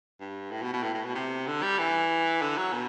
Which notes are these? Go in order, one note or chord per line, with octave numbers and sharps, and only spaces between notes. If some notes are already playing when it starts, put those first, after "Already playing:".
G2
A2
B2
B2
A2
A2
B2
C3
D3
G3
E3
D3
F#3
B2